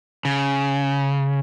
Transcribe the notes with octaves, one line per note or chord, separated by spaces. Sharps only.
C#3